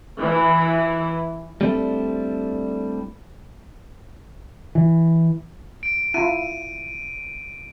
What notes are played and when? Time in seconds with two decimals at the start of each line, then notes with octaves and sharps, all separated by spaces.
0.21 E3
1.61 G3 A3 C4 D4 E4 A4
4.75 E3
5.83 D7
6.14 E4 F4 D#7